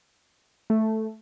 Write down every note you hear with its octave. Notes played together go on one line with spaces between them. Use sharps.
A3